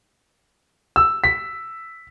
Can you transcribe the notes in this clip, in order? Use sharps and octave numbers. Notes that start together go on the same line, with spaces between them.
E6
B6